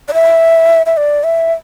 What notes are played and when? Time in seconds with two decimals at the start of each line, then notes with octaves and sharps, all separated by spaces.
0.08 D5
0.14 E5
0.86 E5
0.97 D5
1.24 E5